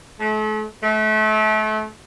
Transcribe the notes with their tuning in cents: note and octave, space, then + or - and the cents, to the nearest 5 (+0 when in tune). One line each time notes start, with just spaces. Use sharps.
A3 -40
A3 -30